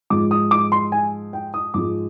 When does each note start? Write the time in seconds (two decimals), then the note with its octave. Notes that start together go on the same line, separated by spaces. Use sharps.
0.10 G#2 F3 G#3 D6
0.31 D#6
0.51 D6
0.72 C6
0.92 G#5
1.33 G5
1.54 D#6
1.74 G#2 F3 G#3 D6